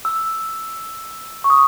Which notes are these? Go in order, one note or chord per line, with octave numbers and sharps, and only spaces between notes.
E6
C#6
D#6